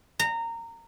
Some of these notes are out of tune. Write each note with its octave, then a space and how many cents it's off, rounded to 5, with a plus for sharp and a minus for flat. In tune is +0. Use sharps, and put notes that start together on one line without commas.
A#5 -20